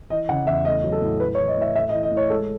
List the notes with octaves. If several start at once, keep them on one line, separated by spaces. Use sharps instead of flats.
E3 D#5
C#3 F#5
E2 E5
A3 D#5
F#3
A4
A2
A3 B4
C#5
E3
D#5
A2 E5
A3 E5
D#5
E3
D#5
A2
C#5
G#3 A4